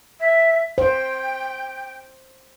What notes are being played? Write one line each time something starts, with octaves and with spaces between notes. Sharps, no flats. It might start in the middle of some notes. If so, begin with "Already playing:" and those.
E5
C5 G5